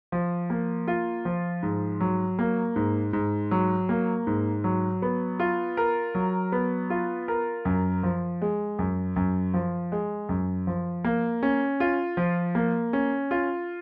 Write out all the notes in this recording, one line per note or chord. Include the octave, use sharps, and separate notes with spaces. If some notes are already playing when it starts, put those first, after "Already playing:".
F3
A#3
F4
F3
G#2
F#3
A#3
G#2
G#2
F#3
A#3
G#2
F#3
B3
F4
A#4
F#3
B3
F4
A#4
F#2
F3
G#3
F#2
F#2
F3
G#3
F#2
F3
A#3
C#4
F4
F3
A#3
C#4
F4